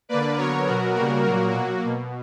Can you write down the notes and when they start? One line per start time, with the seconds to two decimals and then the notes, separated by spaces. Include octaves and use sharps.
0.09 D3 A#3 B4 D5
0.37 D3 F#3 B3 A#4 C#5
0.66 B2 F#3 B3 F#4 A#4
0.95 C#3 G3 A#3 F#4 A#4
1.24 A#2 F#3 A#3 F#4 A#4
1.51 B2 F#3 A#3 F#4
1.80 A#3
1.85 B2